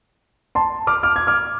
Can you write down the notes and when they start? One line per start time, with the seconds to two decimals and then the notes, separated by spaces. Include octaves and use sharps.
0.55 A5 C6
0.87 D6 F6
1.03 D6 F6
1.16 G#6
1.27 D6 F6